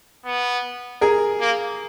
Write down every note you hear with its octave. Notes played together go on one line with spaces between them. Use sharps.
B3
G#4 A#4
A#3